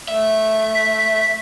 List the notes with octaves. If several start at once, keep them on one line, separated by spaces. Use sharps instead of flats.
A3 E5
B6